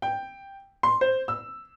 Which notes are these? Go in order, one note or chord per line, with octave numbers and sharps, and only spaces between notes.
G5
C6
C5
E6